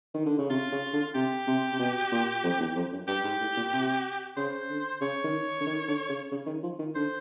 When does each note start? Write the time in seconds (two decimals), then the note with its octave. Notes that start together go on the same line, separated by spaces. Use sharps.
0.14 D#3
0.26 D3
0.38 C#3
0.50 C3 F4
0.72 C#3
0.93 D3
1.15 C3 G4
1.47 C3
1.72 C3
1.79 B2
2.12 A#2
2.44 F2
2.60 E2
2.76 F2
2.92 F#2
3.08 G2 G4
3.24 G#2
3.41 A2
3.57 A#2
3.73 C3
4.37 C#3 C5
4.70 D3
5.01 C#3 C#5
5.24 D#3
5.60 D3
5.67 D#3
5.88 D3
6.09 C#3
6.32 C#3
6.47 D#3
6.63 F3
6.79 D#3
6.95 D3 C5